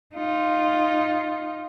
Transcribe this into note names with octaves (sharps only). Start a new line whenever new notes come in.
D#4 F4